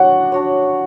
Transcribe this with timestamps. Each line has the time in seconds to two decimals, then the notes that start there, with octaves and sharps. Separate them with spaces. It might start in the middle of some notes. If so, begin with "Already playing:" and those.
Already playing: D4 F#4 C#5 F#5
0.32 D4 F#4 C#5